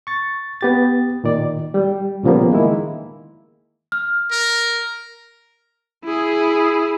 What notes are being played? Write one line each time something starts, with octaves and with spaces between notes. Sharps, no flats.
C#6 A6
B3 G4 A6
A#2 D#3 D5
G3
A#2 C#3 F3 G3 A#3 B3
D#3 G#3 A#3 E4
F6
A#4
E4 G#4